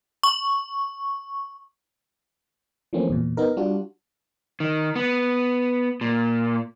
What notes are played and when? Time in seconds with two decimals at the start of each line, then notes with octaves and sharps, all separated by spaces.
0.23 C#6
2.93 E3 F3 A3 A#3 C4 C#4
3.10 E2 A#2
3.37 B3 D#4 A#4
3.57 G3 D4 F4 F#4
4.60 D#3
4.96 B3
6.01 A#2